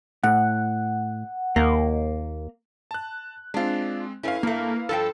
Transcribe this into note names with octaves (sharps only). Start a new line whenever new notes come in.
A2 F#5
D#2 A#3
A5 F#6
G#3 C4 D4 F4
F#2 A3 C#4 E4 B4 F5
G2 A3 A#3
G2 F3 A4 G5